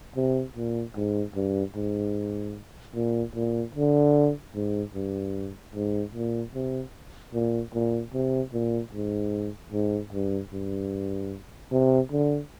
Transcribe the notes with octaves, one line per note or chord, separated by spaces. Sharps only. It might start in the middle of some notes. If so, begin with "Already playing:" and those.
C3
A#2
G#2
G2
G#2
A#2
A#2
D3
G#2
G2
G#2
A#2
C3
A#2
A#2
C3
A#2
G#2
G#2
G2
G2
C3
D3